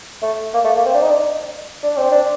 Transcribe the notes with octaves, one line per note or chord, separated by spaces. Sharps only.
A3
A#3
A3
A#3
C4
D4
D#4
D4
D4
C4
D4